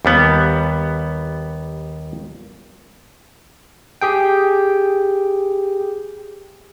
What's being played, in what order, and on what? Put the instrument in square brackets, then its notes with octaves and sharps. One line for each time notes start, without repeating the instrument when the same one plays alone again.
[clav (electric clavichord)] D#2 G3 B3
[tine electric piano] G4 G#4 G5